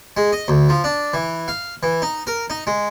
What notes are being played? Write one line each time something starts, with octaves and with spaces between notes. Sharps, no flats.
G#3
D#5
D2
F3
D4
E3
F5
E3
D#4
A#4
D#4
G#3